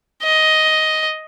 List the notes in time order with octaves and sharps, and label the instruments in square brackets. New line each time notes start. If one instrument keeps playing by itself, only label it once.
[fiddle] D#5